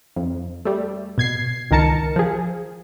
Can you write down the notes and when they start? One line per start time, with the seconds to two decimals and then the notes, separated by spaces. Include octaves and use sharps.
0.16 F2
0.65 G3 A3
1.18 B2 G#6 C7
1.71 C#2 D#3 A#4 A5 C#7
2.16 F3 G#4